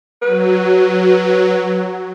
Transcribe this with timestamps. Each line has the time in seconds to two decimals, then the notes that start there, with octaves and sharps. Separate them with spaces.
0.22 F#3 B4